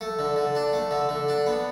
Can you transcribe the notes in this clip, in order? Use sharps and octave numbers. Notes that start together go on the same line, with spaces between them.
A3
D3
D3
D4
A3
D3
D3
D4
B3